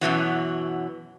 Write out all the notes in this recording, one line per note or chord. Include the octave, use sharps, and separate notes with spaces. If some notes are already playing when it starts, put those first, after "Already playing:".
F#2 B2 E3 F#3